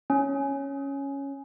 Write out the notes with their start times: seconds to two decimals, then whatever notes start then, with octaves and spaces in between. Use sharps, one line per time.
0.10 C#4